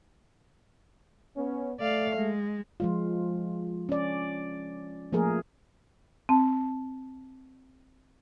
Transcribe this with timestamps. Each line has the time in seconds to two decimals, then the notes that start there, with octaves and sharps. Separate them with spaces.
1.37 B3 C#4
1.80 A3 D5 F5
2.16 G#3
2.80 F3 G#3 F4
3.89 C#4 D5
5.13 F3 A3 A#3 G#4 A#4
6.29 C4 A5